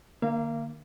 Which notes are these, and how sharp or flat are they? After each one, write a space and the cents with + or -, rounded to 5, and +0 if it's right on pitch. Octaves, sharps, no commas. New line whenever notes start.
D3 +45 A#3 +0 F5 -35